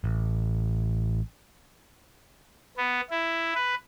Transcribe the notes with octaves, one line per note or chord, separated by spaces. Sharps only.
A1
B3
E4
B4